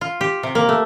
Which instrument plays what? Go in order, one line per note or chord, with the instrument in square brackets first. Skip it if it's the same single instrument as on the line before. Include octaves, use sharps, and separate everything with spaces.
[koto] F4
G4
C3
A#3
A3